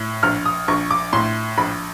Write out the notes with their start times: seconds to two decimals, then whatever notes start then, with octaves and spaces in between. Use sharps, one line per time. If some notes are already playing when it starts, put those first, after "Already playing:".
Already playing: A2
0.23 A#1 F6
0.45 D#6
0.68 A#1 C#6
0.91 D6
1.13 A2 C6
1.58 A#1 B5